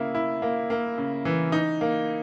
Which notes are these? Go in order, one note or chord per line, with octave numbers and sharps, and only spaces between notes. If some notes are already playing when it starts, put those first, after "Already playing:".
Already playing: C#3 A#3 E4
E4
A#3
A#3
C#3
E3
D#4
A#3